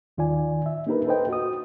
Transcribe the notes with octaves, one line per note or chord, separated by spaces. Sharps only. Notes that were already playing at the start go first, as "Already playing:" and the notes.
D#2 D#3 F4 D5 G#5
E5
A#3 D4 D#4 G4 A#4 B4
A4 B4 C5 D#5 G5
F#4 D#6